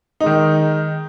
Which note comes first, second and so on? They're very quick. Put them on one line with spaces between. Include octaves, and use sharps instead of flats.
D#4 G#3 D#3